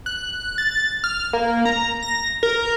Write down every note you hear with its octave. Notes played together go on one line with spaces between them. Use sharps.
F#6
A6
F6
A#3
A#5
A#6
A#4